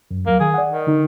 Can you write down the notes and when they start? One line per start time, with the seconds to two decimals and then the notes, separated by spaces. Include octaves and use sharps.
0.11 F#2
0.26 D#2 F#3 A#3
0.40 D#3 G#4
0.54 D5 F#5
0.69 D#3
0.87 D3 D#4